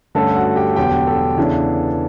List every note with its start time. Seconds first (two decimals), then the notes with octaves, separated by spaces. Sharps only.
0.15 G2 D3 A3 C#4 A4 A5
0.36 F#4 F#5
0.56 G4 G5
0.76 E1 E2 D3 F#3 G4 G5
1.07 A4 A5
1.38 E2 C#3 E3 B3 D4